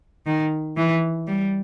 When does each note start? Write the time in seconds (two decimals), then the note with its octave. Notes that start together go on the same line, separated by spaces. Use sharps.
0.26 D#3
0.77 E3
1.27 G3